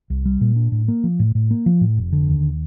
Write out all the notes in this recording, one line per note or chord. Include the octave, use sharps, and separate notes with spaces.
C2
G3
A#2
D4
A2
A#3
F3
A2
A2
A#3
F3
A2
F1
D3
D#2